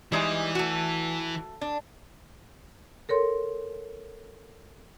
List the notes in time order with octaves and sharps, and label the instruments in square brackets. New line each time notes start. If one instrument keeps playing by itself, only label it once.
[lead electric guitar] E3 E4 [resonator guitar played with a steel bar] G3 G#3 D#4
[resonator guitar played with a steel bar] A3 F#4
D4
[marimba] A4 A#4 C#5 C6